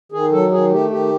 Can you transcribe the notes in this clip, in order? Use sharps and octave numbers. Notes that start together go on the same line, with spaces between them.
D#3 G#4
F#3 A4
D#3 G#4
A3 G4
D#3 G4